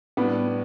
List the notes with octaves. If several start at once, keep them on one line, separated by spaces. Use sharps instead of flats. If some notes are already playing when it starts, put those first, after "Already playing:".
A2 G3 B3 D4